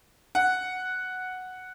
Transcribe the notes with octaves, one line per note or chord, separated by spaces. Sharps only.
F#5